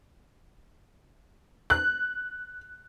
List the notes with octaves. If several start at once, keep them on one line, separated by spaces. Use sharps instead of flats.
F#6